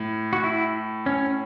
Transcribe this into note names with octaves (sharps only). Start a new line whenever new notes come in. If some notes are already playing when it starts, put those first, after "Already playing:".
Already playing: A2
F#4
E4
C#4